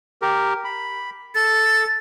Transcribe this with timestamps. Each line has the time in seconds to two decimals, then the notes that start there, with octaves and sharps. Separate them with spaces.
0.22 G4 A#4
0.64 B5
1.35 A4 A6